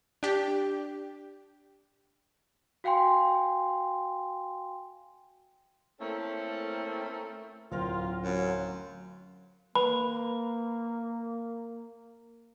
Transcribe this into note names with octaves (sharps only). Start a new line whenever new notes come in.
D4 G4
F#4 F5 G5 G#5 C6
A3 A#3 C4 C#4 E4 A4
D1 C4 F4 A#4 F5
F#2 F#3
A#3 B4 B5